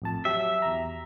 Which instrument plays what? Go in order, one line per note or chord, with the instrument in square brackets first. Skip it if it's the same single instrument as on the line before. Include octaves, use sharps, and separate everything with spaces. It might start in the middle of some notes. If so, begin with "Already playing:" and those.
[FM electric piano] A1 F2 A5
[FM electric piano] F#3 G4 [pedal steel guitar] E5
[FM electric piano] E2 A#5